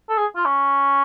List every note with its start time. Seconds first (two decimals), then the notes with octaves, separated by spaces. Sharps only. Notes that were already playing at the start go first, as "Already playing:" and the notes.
0.09 A4
0.17 G#4
0.36 F4
0.45 C#4